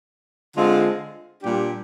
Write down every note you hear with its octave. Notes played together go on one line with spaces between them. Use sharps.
D3 G#3 C4 F4
A#2 G3 D4 G4